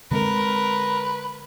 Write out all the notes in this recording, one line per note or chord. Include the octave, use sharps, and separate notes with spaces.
D3 G#3 C4 A#4 B4